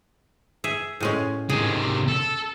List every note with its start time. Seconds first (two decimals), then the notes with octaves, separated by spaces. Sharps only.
0.64 G#4 E5
1.00 A2 G#3 C#4
1.49 C3 D#3 G#4
2.08 A4